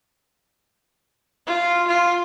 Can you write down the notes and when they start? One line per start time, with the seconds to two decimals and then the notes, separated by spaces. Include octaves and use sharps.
1.47 F4
1.88 F4